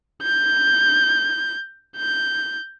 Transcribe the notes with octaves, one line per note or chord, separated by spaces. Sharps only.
G6
G6